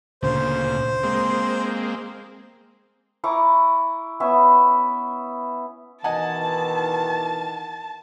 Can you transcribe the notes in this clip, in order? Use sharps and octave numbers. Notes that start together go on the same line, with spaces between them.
D2 A#2 C#3 C5
G#3 A#3 C4
E4 A#5 C#6 D6
B3 C#4 E5
B2 D#3 E3 D#5 F#5 G#5 A5